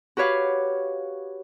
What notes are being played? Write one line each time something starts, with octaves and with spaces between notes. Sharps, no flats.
F#4 G4 B4 C#5 F5